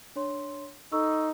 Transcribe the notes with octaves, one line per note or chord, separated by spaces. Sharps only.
D4 C#5 C6
D#4 A4 C#6 E6